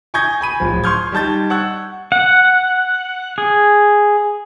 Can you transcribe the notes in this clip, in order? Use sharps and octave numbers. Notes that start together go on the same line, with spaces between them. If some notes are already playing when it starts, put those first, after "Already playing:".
G#5 C#6 D#6 G6 G#6 A#6
G#5 B5 D#7
D1 F3
C6 C#6 D#6 F6 G6 G#6
G3 D#4 A5 G6 A6
F#5 C#6 E6 F#6 G#6
F#5
G#4